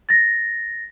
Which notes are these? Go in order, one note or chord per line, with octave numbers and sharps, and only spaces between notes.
A6 A#6